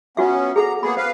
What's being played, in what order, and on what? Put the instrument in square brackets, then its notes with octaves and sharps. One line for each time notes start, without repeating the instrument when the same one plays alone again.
[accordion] B3 C#4 [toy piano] F4 F#4 E5
[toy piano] G#4 A4 F#5 [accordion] A#5
[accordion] A#3 B3 G#4 [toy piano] B5
[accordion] B4 F5 [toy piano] C5